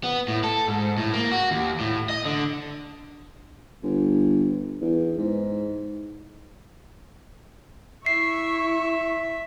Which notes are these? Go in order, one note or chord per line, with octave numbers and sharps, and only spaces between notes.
B3
A2
A4
G#2
A2
A#3
F#4
D#2
A2
D#5
D3
G1
E2
G#2
E4 E5 C#6 C7